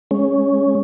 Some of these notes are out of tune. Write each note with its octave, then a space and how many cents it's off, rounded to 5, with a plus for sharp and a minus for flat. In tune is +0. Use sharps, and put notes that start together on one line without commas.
G#3 +0 C#4 +0